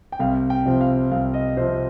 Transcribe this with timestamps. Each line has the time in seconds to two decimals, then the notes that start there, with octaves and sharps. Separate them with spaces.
0.12 G5
0.19 C2 F5
0.50 G5
0.66 C3 F3 C4
0.81 F5
1.11 C2 F5
1.34 D#5
1.57 C3 F3 C4 C5